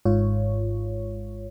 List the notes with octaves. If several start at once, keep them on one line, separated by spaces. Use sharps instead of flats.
G#1 G#2 F4 C#5